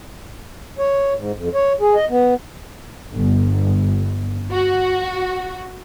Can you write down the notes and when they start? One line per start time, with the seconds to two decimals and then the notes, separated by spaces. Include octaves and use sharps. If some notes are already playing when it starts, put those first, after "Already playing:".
0.79 C#5
1.17 G#2
1.34 F2
1.54 C#5
1.81 G#4
1.95 D#5
2.10 B3
3.14 G1
4.50 F#4